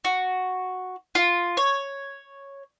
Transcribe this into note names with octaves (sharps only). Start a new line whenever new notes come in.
F#4
F4
C#5